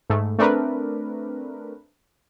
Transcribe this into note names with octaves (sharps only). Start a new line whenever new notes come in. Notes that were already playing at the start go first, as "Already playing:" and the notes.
G#2 A3
A3 C4 D4 A#4 B4